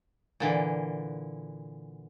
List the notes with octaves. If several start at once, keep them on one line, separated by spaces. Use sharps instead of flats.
A#2 D3 E3